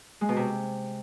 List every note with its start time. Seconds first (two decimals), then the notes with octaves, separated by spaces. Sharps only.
0.21 G#3
0.29 B2
0.36 C3